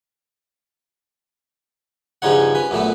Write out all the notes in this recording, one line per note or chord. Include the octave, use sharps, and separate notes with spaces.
G2 C#3 F3 D#4 C#5 F#5
C#4 B4
F#2 A#2 A3 B3